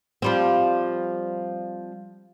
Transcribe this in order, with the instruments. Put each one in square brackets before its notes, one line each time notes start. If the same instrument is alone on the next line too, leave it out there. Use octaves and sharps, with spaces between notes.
[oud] F3 G3 C4